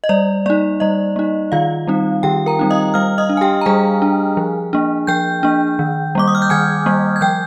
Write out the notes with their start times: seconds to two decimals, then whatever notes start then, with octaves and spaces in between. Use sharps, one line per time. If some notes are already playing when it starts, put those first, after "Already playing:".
0.04 D#5
0.09 G3 D5
0.46 A#3 D#4 D5
0.80 G3 D#5
1.16 A#3 D#4
1.52 D#3 F4 F5
1.87 G3 C4 D#4
2.23 D#3 G4 G5
2.46 A#4 A#5
2.59 G3 C4 D#4
2.70 D#5 D#6
2.94 G3 F5 F6
3.18 D#5 D#6
3.29 D4
3.37 G#5
3.41 G4 G5
3.61 A#5
3.66 G3 G#4 G#5
4.02 D4
4.37 F3
4.73 A#3 D4
5.07 F3 G5 G6
5.43 A#3 D4
5.79 D#3
6.15 G3 A#3 D6
6.28 D#6
6.35 F6
6.42 G6
6.50 D#3 G#5 G#6
6.86 G3 A#3
7.16 G#6
7.21 F3 G5 G6